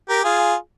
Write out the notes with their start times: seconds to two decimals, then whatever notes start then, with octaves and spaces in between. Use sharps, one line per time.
0.09 G4 A#4
0.23 F4 G#4